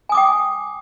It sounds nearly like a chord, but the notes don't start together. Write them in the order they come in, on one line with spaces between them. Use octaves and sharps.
G#5 D#6 D6 G5